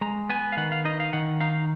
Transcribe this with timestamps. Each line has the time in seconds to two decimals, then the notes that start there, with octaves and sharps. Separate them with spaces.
0.01 G#3 A#5
0.30 B3 G#5
0.52 F5
0.57 D#3 F#5
0.72 F5
0.85 D#4 D#5
1.00 F5
1.13 D#3 F#5
1.40 D#4 F5